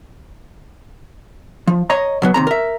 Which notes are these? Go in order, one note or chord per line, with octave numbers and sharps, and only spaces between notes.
F3
C#5 D#5 A#5
B2 F#3 B3
D#2 C3 A#5
A#4 E5